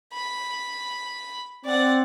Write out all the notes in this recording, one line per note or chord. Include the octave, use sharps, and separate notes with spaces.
B5
C4 D5 F#5